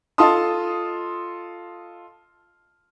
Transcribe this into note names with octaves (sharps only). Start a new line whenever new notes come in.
F4 A4 D#5 A5 C6 D#6